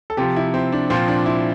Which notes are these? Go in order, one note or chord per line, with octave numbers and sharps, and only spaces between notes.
A4
C3 F3 G4
E4
C4
D4
A#2 F3 C4
D4
E4